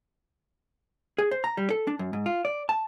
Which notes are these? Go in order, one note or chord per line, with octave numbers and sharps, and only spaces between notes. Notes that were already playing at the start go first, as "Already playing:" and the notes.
G#4
C5
A#5
G3
A4
D4
F#2
G#2
F4
D5
A5